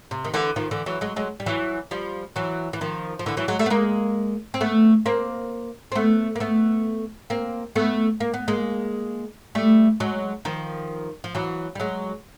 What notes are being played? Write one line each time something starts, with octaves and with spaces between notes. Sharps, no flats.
C3
D#3
D3 E3
D#3 F3
D3 E3
E3 F#3
F#3 G#3
F#3 G#3
G3
E3 F#3
F3 G3
E3 F#3
E3
D#3 F3
F3
D3 E3
E3 F#3
F#3 G#3
G3 A3
B3
G#3 A#3
C4
A3 B3
A#3 C4
C4
A3 B3
A#3
A3 B3
A#3 C4
A3 B3
A#3
B3
G#3 A#3
G3 A3
F#3 G#3
D#3 F3
F3
E3 F#3
G3
F#3 G#3